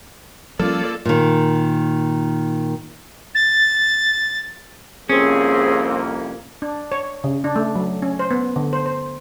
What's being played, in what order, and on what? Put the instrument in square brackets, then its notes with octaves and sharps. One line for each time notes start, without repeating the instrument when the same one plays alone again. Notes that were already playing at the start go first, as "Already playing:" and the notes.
[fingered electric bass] F3 G3 C#4 [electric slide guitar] A#3 [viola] F4 D5 [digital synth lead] A4
[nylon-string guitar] A#2 D#3
[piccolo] A6
[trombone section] C2 F2 A#3 [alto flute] C4 [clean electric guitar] C#4 [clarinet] G#4
[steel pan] D4
C#5
C#3
D4
A3
F#3
C#4
C5
B3
D3
C5
C5